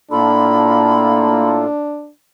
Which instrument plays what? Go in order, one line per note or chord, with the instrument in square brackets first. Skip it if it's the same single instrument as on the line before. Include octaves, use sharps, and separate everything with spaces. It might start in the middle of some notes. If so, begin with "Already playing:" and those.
[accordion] A2 F4 A4 [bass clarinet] A#3 [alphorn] D4 [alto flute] B5